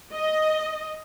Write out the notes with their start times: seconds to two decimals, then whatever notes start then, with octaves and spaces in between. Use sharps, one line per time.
0.15 D#5